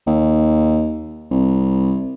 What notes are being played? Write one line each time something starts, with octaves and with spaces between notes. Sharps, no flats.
D#2
C2